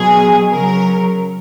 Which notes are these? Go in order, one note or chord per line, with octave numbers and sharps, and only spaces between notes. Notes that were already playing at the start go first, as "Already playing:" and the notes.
Already playing: B2 F#3 G#4
C#3 F#3 A#4